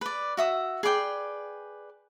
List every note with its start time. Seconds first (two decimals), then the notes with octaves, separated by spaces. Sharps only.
0.01 B4 D5
0.37 F#4 E5 D#6
0.83 G#4 B4 D5 G5